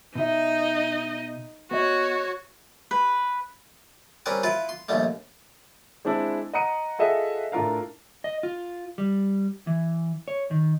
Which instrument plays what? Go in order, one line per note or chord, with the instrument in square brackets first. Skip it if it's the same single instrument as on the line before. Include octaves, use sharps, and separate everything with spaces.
[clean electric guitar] B2 E5 [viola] D#4 D#5
[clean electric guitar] B3 D#5 [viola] F#4 C#5
[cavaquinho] B4
[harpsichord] G3 C4 C#4 A#4 B4
E4 F4 B4
C6
A#1 D#2 G3 A3
[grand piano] G#3 C4 D4 E4
D#5 F#5 A#5 D#6 C#7 D#7
F4 G#4 A4 D#5 E5 F#5
A2 D4 F4 A#4 F5
[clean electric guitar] D#5
F4
G3
E3
C#5
D#3